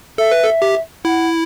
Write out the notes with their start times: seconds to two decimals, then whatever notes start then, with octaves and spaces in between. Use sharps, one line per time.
0.18 A4 E5
0.32 B4
0.44 A4
0.62 G4
1.04 E4 F#5